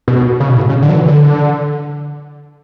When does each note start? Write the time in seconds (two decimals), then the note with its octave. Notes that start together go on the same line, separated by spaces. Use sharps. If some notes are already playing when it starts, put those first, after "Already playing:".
0.08 B2
0.40 C#3
0.49 B2
0.57 A2
0.69 C#3
0.82 D3
0.89 F#3
0.93 E3
1.06 D3